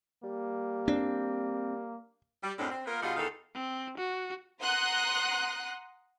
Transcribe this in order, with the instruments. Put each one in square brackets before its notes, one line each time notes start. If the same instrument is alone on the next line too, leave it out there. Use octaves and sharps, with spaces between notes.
[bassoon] G3 [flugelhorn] A#3
[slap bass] C4 [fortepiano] D4
[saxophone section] G3
F#2 A2 F#3 G#3 C4 D4
C4
A#3 B3 F4 A#4
B2 G3 D#4 F4 G#4 F#5
E2 D#3 D#4 A4 F5
[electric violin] C4
F#4
[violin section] F#5 A#5 C6 D#6 F#6